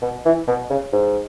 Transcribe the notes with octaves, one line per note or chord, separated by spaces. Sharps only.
B2
E3
B2
C#3
G#2